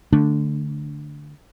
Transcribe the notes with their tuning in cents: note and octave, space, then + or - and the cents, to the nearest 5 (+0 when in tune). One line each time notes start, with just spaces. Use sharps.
D3 +0 A3 +0 D4 -5